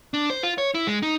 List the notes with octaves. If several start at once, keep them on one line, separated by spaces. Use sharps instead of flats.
D4
C5
F4
C#5
E4
G#3
D#4